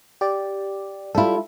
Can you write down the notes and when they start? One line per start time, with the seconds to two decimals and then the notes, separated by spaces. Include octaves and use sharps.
0.21 G4 D5
1.15 G3 E4 F4 A4